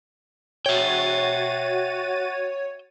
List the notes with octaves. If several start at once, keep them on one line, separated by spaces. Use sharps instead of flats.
F#4 C#5 E5 G5 A6 D#7